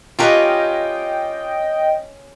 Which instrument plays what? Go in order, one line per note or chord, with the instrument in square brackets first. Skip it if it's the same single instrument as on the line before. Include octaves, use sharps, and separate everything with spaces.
[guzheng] C#4 A#4 B4 [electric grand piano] F4 G4 [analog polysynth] D#5 G5